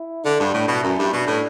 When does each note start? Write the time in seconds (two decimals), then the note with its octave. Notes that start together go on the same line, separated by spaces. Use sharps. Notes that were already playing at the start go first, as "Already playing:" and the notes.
Already playing: E4
0.24 D3 D4
0.40 G2
0.54 A2
0.68 B2 E4
0.83 F#2
0.99 G2
1.12 B2 D4
1.27 A2